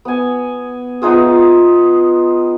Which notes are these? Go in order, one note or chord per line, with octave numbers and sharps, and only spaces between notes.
B3 G#5
B3 D#4 F4 G#4